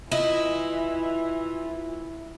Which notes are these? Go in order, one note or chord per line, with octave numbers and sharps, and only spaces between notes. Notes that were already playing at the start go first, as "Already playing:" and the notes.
E3 E4 F4 D#5